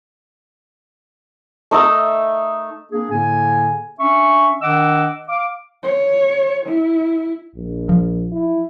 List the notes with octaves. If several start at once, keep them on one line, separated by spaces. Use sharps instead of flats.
A3 D#4 A#5 E6
A#3 C4 D4 G#4
A2 D3 A#3 G#4 G#5
C#4 D4 E5 C#6
D#3 D4 D#5 F#5 D6 E6
F5 D6
C#5
E4
A#1
F3
E4